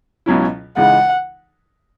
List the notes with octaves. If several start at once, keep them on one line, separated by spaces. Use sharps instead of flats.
C#2 B2 F#3 C#4 E4
C#2 C#3 E3 G#3 D#4 F#5